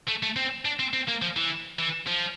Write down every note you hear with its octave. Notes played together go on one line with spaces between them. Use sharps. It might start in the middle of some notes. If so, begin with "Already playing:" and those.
A3
A3
C4
D4
C4
C4
A#3
F3
E3
E3
F3